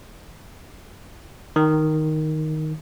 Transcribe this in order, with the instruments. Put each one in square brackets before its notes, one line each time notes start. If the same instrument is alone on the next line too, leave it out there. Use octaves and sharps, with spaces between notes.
[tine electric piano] D#3